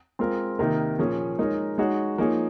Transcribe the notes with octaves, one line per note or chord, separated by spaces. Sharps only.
G#3 C4 F4 A#4
C3 D#3 A#3 D#4 A#4
A#2 F3 A#3 C#4 G#4
G#3 D#4 A#4 C#5
G#3 D#4 F#4 C#5
F3 A#3 D#4 G#4 C#5